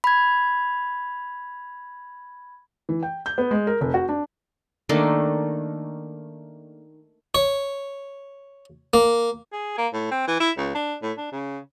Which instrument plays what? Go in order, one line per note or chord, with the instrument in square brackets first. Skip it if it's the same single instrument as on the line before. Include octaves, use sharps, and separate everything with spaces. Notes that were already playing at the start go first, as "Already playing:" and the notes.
[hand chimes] B5 G#6
[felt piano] E3
G5
G6
B3
G#3
A#4
F1
F#4
D4
[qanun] D#3 A3 A#3 D4
[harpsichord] C#5
A#3
[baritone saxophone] G#4
A#3
A2
C4
E3
E4
C#2
D4
A2
D4
C#3